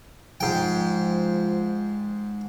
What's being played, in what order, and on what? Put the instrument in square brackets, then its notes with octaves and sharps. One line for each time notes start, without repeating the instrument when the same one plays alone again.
[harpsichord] G#2 G5 [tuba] F3